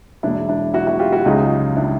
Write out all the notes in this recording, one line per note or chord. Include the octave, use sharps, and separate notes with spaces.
E1 E2 B2 F#3 D4 E4
D4 E4
E4 F#4
E4 F#4
F4 G4
E4 F#4
C#2 C#3 F#3 D#4 F4
D4 E4